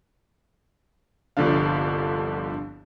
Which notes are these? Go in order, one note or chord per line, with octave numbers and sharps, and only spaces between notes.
G1 C2 D3 F3 D4 F5